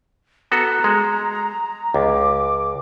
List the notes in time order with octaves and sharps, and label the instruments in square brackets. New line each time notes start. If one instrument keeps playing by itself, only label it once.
[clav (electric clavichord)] B3 F#4 A4 [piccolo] A#5
[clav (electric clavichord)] G#3
[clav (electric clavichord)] C#2 [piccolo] D6